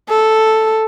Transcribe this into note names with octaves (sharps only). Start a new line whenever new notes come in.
A4